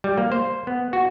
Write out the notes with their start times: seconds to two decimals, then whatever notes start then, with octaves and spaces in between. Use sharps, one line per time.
0.04 G3
0.18 A#3
0.32 C5
0.67 B3
0.93 F#4